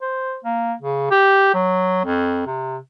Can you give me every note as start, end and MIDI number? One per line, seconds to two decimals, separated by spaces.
0.01 0.37 72
0.44 0.73 58
0.81 1.10 49
1.11 1.54 67
1.54 2.02 54
2.05 2.45 41
2.46 2.78 48